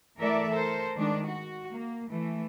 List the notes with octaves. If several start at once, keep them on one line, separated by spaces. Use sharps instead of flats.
E3 A3 A4 A#4 D5 E5
A4 A#4 C5
D#3 G#3 D4
F#4
A#3
E3 A3